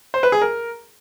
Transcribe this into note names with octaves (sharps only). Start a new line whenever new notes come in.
C5
B4
G#4
A#4